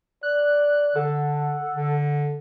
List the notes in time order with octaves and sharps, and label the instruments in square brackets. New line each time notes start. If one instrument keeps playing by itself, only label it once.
[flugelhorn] D5 [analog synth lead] F#6
[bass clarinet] D3 [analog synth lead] A4 [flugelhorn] F#5
[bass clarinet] D3